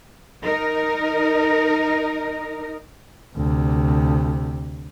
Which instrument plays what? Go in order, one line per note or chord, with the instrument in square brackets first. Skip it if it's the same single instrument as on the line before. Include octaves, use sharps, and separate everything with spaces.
[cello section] D#4 A#4
[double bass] D2 C3